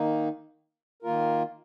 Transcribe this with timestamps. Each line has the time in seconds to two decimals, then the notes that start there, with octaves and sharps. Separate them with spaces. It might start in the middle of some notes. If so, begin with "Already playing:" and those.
Already playing: D#3 A#3 D#4
1.03 D#3 A#3 F4 A#4